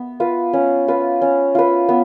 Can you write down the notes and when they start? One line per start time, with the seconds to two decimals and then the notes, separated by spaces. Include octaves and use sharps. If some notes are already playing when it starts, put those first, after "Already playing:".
Already playing: B3
0.20 F4 B4
0.53 C#4
0.88 F4 B4
1.22 C#4
1.55 F4 B4
1.89 B3